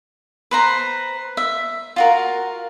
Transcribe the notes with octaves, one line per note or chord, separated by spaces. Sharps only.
B4 C5 A#5
E5
F4 F#4 A#4